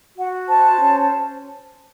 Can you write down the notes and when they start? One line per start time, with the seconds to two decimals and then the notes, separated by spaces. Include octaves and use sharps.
0.17 F#4 F#5
0.48 C5 A5
0.79 C#4